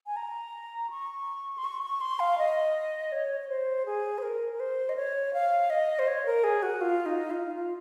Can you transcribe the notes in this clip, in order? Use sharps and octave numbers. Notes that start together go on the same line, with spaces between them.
G#5
A#5
C#6
C6
C#6
C#6
C6
F5
D#5
C#5
C#5
C5
G#4
C5
A#4
A#4
C5
D#5
C#5
F5
D#5
C5
C#5
A#4
G#4
F#4
F4
D#4
F4
F4